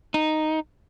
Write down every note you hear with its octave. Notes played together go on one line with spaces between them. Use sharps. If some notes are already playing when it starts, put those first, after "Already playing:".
D#4